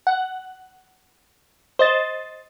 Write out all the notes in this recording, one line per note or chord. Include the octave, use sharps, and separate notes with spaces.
F#5
C5 D#5 A6